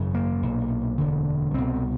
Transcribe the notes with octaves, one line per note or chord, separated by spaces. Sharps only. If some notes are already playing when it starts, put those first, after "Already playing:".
Already playing: G#1 F#2 C#3
A#3
B1 A#2
E1 D2 D3
C2 B2 C4